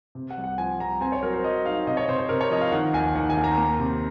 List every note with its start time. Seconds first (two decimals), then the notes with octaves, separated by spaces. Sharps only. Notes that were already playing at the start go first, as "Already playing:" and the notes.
0.15 C3
0.30 F#5
0.38 C2
0.44 F#5
0.58 F3 G#5
0.79 C2 A#5
1.01 C4 G#5
1.12 C#5
1.23 F#3 A#4
1.33 C5
1.44 F#3 D#5
1.65 D#4 F5
1.87 C3 D#5
1.97 C#5
2.08 C3 C5
2.19 C5
2.29 C3 A#4
2.41 C#5
2.51 F3 D#5
2.61 F5
2.72 D#3 F#5
2.93 D#2 G#5
3.15 D#3 F#5
3.30 G#5
3.37 D#2
3.44 A#5
3.58 A#3
3.79 C3